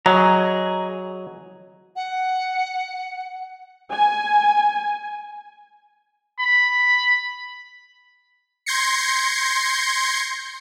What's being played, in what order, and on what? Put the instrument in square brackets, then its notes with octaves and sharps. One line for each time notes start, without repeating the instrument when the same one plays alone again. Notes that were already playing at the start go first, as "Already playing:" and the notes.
[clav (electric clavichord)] F#3 [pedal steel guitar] G#4 D#5 A#5
[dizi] F#5
[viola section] G#5
[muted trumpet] B5
[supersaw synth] C6 G6 G#6 A#6 C7 C#7